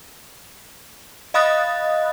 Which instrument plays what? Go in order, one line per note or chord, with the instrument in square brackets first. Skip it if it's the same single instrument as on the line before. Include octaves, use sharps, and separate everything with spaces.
[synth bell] D#5 F5 B5 D#6 F#6 A6